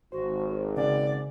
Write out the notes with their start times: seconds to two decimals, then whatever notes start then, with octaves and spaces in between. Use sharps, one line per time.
0.12 G#1 F#4 C5
0.76 C#3 D5 F#5 G#5